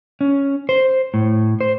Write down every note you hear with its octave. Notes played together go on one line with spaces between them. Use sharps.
C#4
C5
A2
C5